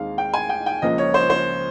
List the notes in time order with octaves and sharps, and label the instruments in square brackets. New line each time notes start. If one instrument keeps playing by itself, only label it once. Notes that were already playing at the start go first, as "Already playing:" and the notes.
Already playing: [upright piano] D#2 D#3 G#3 C4 F5
G5
G#5
G5
G5
C#2 C#3 F3 A#3 D#5
C#5
C5
C5